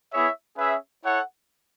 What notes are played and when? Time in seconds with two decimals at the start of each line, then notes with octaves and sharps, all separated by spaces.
0.12 B3 E4 G#4 C#5 E5
0.58 C#4 G#4 B4 E5
1.04 E4 A4 C#5 F#5